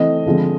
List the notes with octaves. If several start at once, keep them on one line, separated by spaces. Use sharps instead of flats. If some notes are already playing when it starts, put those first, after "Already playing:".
Already playing: E3 A3 C4 D#5
D3 F3 G#3 C4